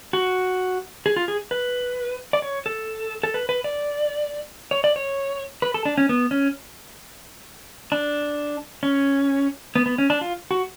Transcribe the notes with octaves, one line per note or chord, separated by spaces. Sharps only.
F#4
G#4
F4
G#4
B4
D5
C#5
A4
A4
B4
B4
D5
C#5
D5
C#5
B4
A4
D4
C#4
B3
C#4
D4
C#4
B3
B3
C#4
D4
F4
F#4